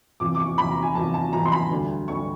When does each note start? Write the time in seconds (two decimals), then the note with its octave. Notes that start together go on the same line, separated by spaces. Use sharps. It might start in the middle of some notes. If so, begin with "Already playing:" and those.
0.20 E2 C3 F3 D6
0.35 D6
0.39 C#6
0.58 E2 C3 F3 B5
0.71 A#5
0.83 G#5
0.95 E2 C3 F3 A5
1.14 A5
1.33 E2 C3 F3 A#5
1.46 C6
1.52 B5
1.71 D2 D3 G3
2.08 D2 D3 G3 C#6